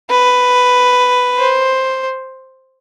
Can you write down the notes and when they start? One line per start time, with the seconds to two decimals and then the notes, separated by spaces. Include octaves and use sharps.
0.10 B4
1.38 C5